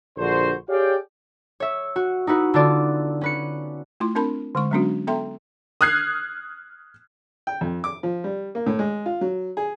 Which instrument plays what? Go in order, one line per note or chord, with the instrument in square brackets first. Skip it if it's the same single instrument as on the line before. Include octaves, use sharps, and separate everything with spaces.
[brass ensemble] A#1 D3 D4 F#4 C5
G4 G#4 C#5 D5 F5 G5
[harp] C#5 E5
F#4
D#4 E4 F#4 B4
D3 B3 D4 F4 D5
C#4 B4 C#7
[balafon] A3 E4 F4 C6
C4 D4 A#4 A5 B5
D3 G#3 C#6
F#3 G#3 B3 C#4 D4 F#4
B3 A4 E5 G5 A#5 C6
[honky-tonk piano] D#6 F6 F#6 G#6 C7
[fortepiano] G5
F2
D6
F3
G3
A#3
A2
G#3
F4
F#3
G#4